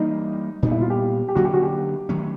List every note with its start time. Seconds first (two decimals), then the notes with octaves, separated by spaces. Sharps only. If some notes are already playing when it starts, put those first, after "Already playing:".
Already playing: E3 G3 A#3 D#4
0.63 A#2 G3 B3 D#4
0.72 E4
0.81 F4
0.90 G4
1.28 G4
1.35 D3 F#3 A#3 C#4 F#4
1.45 G4
1.54 F#4
1.63 G4
2.09 D#3 F#3 A3 C#4